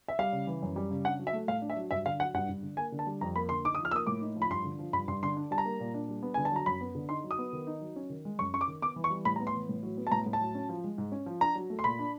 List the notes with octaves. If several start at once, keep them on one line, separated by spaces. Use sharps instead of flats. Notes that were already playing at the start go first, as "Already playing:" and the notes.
E5
G3 F5
C#3
E3
F#2
G3
C#3
D4 F#5
F#3
E5
A3
A2 F5
D4
E5
F#3
G2 E5
D3 F5
F#3 F#5
G2 F#5
G2
D3
A#3 G#5
D3
A5
G3
F2 A#5
A#3 B5
D3 C6
D#4 D6
D#6
F3
F6
A#3 D#6 E6
A2 D6
D#4
F3
B5
G2 C6
D3
F3
G2 B5
G2 C6
D3 C6
D4
G3 A5
A#5
A#3
A#2
D4
G3
B3
D3 G#5
A5
F#3 A#5
F#2 B5
B3
D3
D#4 C6
F#3
D#6
B3
D#3
D#4
F#3
C#4
D#3
G#3
F#2 C#6
C#4 C#6
D6
D#3
B3 D6
E3
C#6
G3
A2 B5
A#5
B3
C6
E3
A2
F#3
B3
A5
A2 A#5
A2
A5
F#3
C#4
F3
G#3
G#2
C#4
F3
D4 A#5
F#3
A3
C6
A#2 B5
D4